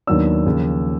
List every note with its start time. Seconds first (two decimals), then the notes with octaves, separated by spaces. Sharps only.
0.07 D#2 D#3 F#3 B3 D4 E6
0.46 D#2 C#3 F3